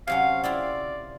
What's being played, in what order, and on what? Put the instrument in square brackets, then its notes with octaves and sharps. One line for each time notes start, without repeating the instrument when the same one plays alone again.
[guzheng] C3 F#3 C#4 [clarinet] F5
[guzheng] C4 E4 F4 [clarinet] D5